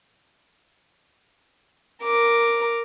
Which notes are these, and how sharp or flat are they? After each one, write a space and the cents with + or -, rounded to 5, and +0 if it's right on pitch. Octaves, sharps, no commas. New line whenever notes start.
A#4 +0 D6 +0